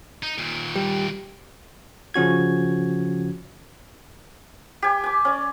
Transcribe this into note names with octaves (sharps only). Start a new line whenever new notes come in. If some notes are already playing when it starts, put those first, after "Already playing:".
D#4
D#2 A#2
G3
C#3 F3 C#4 F#4 G#6
G4 G#5
G#5 D6
C#4 D5